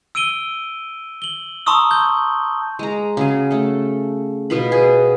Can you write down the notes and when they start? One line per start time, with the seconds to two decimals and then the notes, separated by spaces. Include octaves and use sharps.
0.15 E6 D7 D#7 G7
1.22 F#7 G7
1.66 A5 A#5 C6 C#6 D#6 E6
1.91 G6 G7
2.79 G#3 A#5
3.17 C#3 F#3 G#4
3.51 A3 A4
4.50 B2 B3 F4 B5
4.72 G#4